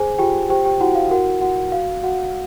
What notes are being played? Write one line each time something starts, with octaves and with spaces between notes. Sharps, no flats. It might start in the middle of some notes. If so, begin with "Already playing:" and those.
Already playing: G#4 C5 G#5
F4 G4 G5
G4 C5 G5
G4 G5
E4 F#4 F#5
F5
F#4 A#4 F#5
F#4 F#5
F#4 F5
F#4 F#5